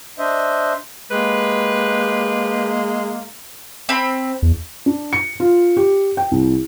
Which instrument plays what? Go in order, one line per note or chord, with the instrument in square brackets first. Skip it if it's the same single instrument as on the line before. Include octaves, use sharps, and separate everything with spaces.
[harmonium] D4 C5 D#5 E5
[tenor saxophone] G#3 [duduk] A#3 [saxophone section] G4 B4
[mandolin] C4 B5
[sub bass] E2
[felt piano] D4
C#7
F4
G4
G5
C2